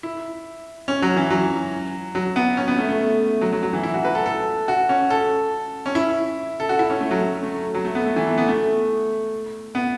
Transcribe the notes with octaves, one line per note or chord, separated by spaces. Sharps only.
E4
C#4
F#3
E3
F#3
F#3
B3
C#4
B3
A3
A3
F#3
F#3
F#3
E3
E4
F#4
B4
A4
A4
F#4
C#4
A4
C#4
E4
A4
F#4
E4
C#4
A3
F#3
A3
A3
F#3
A3
B3
A3
E3
A3
B3
A3
B3